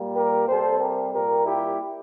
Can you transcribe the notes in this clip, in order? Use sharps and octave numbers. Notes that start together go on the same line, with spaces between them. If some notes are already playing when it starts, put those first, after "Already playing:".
Already playing: A#2 G3 A#3
G4 A#4
C3 G3 C4 A4 C5
G4 A#4
A#2 G3 A#3 G4 A#4
E4 G4